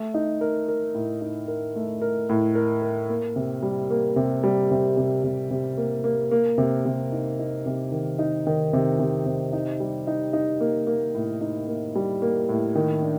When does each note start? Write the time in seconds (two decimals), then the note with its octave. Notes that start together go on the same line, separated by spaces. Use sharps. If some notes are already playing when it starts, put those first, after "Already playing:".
Already playing: A3
0.14 D#4
0.41 A#4
0.68 A#4
0.94 A2
1.21 D#4
1.48 A#4
1.76 A3
2.02 A#4
2.29 A2
2.55 A#4
2.82 A#4
3.09 A#3
3.36 C3
3.62 G3
3.90 A#3
4.16 C3
4.44 G3
4.71 C3
4.97 C3
5.24 C3
5.51 C3
5.77 A#3
6.04 A#3
6.31 A#3
6.58 C3
6.85 C3
7.12 D#4
7.39 D#4
7.66 C3
7.92 D#3
8.19 D#4
8.47 D#3
8.73 C3
8.99 C3
9.26 C3
9.53 D#4
9.80 G3
10.07 D#4
10.33 D#4
10.61 A#3
10.87 A#3
11.14 A2
11.41 D#4
11.68 A#3
11.95 G3
12.22 A#3
12.49 A2
12.75 D#3
13.02 D4